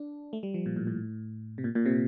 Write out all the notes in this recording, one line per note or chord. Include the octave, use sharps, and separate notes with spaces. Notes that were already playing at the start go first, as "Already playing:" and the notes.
Already playing: D4
A3
G3
F3
A#2
A2
A2
C3
A#2
A#2
C3